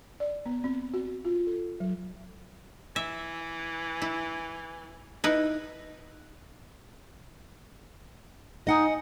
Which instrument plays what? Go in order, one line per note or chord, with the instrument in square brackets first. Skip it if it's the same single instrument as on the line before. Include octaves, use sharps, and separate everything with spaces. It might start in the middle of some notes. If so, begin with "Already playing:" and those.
[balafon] D5
B3
C4
F#4
F4
A4
F#3
[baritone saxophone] E3 [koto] E5
[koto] E4
D#4 E4 B4
[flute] D#4 [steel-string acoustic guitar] D#5 F#5 G#5